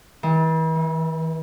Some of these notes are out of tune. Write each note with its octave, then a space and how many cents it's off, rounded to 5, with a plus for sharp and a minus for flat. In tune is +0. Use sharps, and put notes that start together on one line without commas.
E3 -40
E3 +5